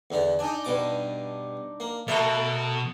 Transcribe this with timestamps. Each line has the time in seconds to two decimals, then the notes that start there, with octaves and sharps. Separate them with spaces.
0.11 E2 D3 D4
0.39 D4 D#4 G#5
0.65 G2 B2 D6
1.80 A#3
2.08 B2 A3 A4 A#4 E5